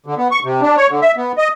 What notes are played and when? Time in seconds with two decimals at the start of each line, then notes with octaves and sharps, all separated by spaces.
0.06 D3
0.18 B3
0.31 C#6
0.44 C3
0.62 D4
0.77 C#5
0.90 D3
1.02 E5
1.17 B3
1.38 D#5